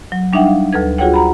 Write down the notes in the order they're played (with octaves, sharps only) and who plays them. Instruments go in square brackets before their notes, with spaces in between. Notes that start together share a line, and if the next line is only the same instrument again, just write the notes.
[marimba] F#3
G3 D4 D#4 E5 F#5 G5
F5
D2 A4 B4 G#6
F4 F#4 G#4 C#5 F#5 G5
F#5 A#5 B5